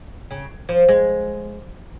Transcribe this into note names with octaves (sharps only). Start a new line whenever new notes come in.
C#3
F3
G#3